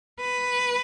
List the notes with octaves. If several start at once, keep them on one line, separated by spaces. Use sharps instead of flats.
B4